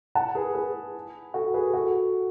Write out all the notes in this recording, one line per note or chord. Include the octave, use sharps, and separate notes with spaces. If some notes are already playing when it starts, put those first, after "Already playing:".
F#5 A5
G#4 B4
G#4 B4
F#4 A4
G#4 B4
F#4 A4